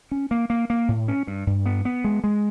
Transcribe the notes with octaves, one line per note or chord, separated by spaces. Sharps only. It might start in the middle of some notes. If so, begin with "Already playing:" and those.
C#4
A#3
A#3
A#3
A2
C#4
G2
G2
B3
B3
G#3
G#3